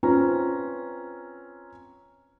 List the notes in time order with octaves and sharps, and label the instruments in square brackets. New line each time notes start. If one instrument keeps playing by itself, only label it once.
[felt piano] C4 C#4 F4 B4 A#5